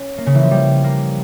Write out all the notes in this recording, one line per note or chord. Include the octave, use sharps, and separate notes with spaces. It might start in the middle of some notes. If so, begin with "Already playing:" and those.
Already playing: C#4
A#3
C#3
E3
F3
G3
A#3